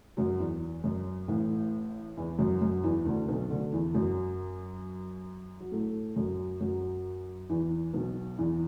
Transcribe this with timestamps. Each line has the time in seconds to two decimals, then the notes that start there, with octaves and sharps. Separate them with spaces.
0.17 F#2 F#3
0.40 E2
0.84 F#2
1.28 A1 A2
2.17 E2 E3
2.39 F#2 F#3
2.61 F#2 F#3
2.84 E2 E3
3.06 D2 D3
3.28 B1 B2
3.50 D2 D3
3.73 E2 E3
3.95 F#2 F#3
5.60 F#3
5.72 A2 A3
6.16 F#2 F#3
6.61 F#2 F#3
7.49 E2 E3
7.94 B1 B2
8.38 E2 E3